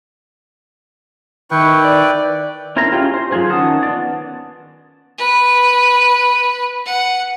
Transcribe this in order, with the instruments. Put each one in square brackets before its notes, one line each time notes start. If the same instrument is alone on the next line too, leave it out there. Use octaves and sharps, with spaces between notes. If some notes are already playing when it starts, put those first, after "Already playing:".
[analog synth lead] D#3 [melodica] E4 B4 G5 [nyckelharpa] C#6
[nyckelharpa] D5
[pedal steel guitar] C#4 E4 A#4 C5 A#5
C#4 E4 F4 G4 G#4
C5
F3 F#3 F4 G#4 C5
D#3 C#4 F#5 A5 D#6
B3 D5
[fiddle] B4
F#5